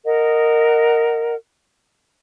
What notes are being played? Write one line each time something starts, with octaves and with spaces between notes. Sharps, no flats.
A#4 D#5 F#5